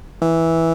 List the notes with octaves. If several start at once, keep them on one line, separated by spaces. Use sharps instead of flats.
E3